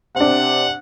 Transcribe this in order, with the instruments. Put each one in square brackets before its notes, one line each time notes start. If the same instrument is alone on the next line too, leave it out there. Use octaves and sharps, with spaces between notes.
[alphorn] C3 [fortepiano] C4 D4 [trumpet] F#5